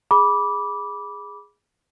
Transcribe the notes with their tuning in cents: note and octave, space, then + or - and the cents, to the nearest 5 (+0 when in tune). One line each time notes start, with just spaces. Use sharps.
G#4 +0 B5 -15 D6 -10